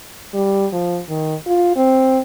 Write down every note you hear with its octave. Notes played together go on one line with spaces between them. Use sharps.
G3
F3
D#3
F4
C4